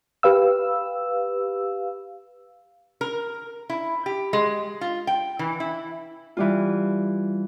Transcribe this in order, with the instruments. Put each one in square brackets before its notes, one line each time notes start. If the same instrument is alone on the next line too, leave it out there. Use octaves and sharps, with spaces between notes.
[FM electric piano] G4 B4 F5 E6
[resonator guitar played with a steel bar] A#4
E4
G4
G#3
F4
G5
E3
E4
[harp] E3 G3 F4